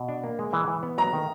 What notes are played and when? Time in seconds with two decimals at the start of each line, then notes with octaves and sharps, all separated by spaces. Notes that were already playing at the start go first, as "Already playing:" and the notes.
Already playing: B2
0.09 D4
0.24 A#3
0.39 G#3
0.53 E3
0.68 E3
0.83 B3
0.98 F#3 A#5
1.13 D#3